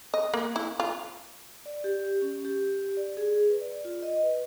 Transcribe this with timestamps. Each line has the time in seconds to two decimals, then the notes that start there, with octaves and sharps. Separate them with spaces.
0.14 D#5
0.34 A#3
0.56 E4
0.80 F4
1.66 D5
1.84 G4
2.22 C#4
2.45 G4
2.97 D5
3.17 G#4
3.50 B4
3.62 D5
3.85 F4
4.03 D#5
4.23 B4